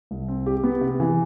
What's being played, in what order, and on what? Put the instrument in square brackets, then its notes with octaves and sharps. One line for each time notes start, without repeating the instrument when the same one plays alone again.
[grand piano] C2
C4
G4
B3
C3
E3